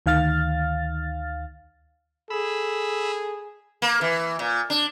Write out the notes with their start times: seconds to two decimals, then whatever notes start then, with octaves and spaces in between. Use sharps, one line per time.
0.06 D2 D#3 F5 F6 A6
2.30 G#4 A4 B5 E6
3.82 A#3
4.01 E3
4.39 A#2
4.70 D4